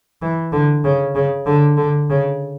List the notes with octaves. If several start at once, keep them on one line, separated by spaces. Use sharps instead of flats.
E3
D3
C#3
C#3
D3
D3
C#3